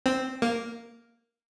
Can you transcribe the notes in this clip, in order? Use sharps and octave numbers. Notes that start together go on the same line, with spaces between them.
C4
A#3